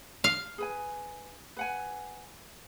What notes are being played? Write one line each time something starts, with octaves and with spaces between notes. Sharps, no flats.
F5
G#4 B4 G#5
B4 F#5 G#5